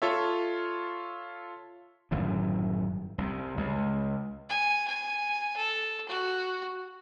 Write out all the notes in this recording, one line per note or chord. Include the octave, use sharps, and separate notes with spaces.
F4 A4 C#5 E5
G1 F#2 A2 D#3
C2 C3
C#2
G#5
G#5
A4
F#4